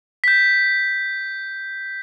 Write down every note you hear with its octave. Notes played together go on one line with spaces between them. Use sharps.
G6 B6